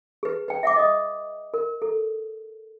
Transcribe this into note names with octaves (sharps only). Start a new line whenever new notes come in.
G#4 B4
B4 G5
E5 F#5 D6
D#5 D#6
A#4
A4